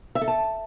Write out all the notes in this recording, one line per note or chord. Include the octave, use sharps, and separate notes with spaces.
E5
A4
A5